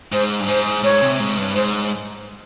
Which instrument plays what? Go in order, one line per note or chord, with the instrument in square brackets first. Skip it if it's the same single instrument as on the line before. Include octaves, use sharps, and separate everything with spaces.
[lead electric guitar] G#2 [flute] C5
[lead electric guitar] G2
[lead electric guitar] G#2 [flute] C5
[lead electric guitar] G#2 [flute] C#5
[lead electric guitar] C3
G#2
G2
[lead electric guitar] G#2 [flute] C5